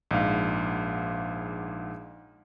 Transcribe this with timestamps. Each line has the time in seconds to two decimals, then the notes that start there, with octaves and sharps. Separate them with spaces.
0.11 A#1 G#2 F5